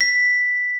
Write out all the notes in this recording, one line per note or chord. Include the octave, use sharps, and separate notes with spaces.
B6